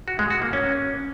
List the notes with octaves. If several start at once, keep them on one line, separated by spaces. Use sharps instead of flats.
F#4
G#3
F#4
A#3
C#4